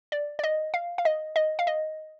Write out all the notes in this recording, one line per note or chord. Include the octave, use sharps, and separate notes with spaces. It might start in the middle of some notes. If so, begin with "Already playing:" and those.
D5
D5
D#5
F5
F5
D#5
D#5
F5
D#5